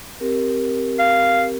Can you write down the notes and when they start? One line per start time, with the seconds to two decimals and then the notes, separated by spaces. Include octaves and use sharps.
0.20 C4 G4 A#4
0.99 F5